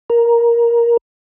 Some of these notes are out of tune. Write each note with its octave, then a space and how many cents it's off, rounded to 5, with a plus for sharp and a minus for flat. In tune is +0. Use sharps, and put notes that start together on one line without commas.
A#4 +10